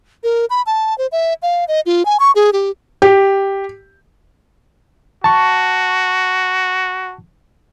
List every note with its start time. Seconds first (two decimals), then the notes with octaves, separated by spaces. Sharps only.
0.24 A#4
0.50 B5
0.67 A5
0.98 C5
1.12 E5
1.42 F5
1.68 D#5
1.86 F4
2.05 G#5
2.20 C#6
2.36 G#4
2.53 G4
3.02 G4
5.24 F#4 A5 C#6